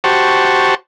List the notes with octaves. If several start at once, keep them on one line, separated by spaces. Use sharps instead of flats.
F#4 G4 C5 A5 C#6